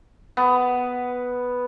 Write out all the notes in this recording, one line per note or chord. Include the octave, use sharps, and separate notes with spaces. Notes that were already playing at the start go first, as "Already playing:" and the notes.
B3